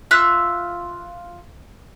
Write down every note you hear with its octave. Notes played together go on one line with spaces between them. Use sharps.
F4 E5 E6 F#6